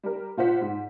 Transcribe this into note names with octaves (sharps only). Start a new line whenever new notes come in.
G3 A#4
A#2 F4 C5 F#5 B6
G#2